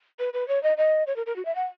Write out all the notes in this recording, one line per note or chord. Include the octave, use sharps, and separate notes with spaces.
B4
B4
C#5
D#5
D#5
C#5
A#4
A#4
F#4
E5
F#5